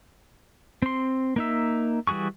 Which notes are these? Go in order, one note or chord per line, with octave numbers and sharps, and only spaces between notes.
C4 C6
A#3 D#4 E5
E3 G3 F#4 G#4 C#6